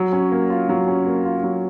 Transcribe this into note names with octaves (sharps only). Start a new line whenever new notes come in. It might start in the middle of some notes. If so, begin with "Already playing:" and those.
Already playing: F#3
C#4
A#3
F4
F#3
C#4
A#3
F4
F#3